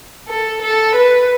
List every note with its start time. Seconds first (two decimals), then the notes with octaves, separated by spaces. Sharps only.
0.28 A4
0.62 A4
0.95 B4